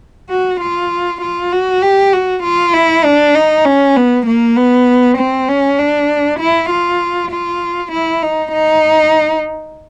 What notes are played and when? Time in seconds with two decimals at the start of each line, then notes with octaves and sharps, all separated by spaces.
0.30 F#4
0.61 F4
1.22 F4
1.52 F#4
1.83 G4
2.13 F#4
2.44 F4
2.74 E4
3.05 D4
3.35 D#4
3.66 C#4
3.96 B3
4.27 A#3
4.57 B3
5.18 C4
5.49 C#4
5.79 D4
6.40 E4
6.70 F4
7.32 F4
7.92 E4
8.23 D#4
8.53 D#4